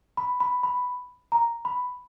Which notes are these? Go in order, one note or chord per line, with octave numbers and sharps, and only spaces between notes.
B5
B5
B5
A#5
B5